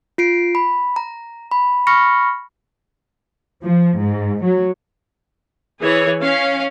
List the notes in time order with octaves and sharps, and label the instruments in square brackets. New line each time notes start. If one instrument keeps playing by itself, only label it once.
[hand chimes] F4 C7 D7
B5
A#5
B5
B5 C#6 F6 A#6 C#7
[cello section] F3
G#2
F#3
[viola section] E3 G#4 C#5
C#4 F5